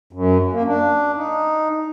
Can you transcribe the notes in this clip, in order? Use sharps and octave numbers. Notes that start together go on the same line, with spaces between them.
F#2
A#3
D4
D#4